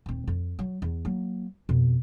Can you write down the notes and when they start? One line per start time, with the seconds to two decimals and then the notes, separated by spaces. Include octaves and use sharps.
0.06 D#1 C4
0.27 F2
0.59 F#3
0.82 E2
1.05 F#3 A#3
1.69 F2 B2